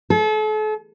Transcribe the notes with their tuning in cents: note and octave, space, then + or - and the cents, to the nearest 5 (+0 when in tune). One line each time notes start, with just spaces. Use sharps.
A4 -40